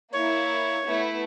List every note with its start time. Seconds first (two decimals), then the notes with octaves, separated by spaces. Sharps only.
0.13 A#3 E4 C#5
0.85 A3 B3 E4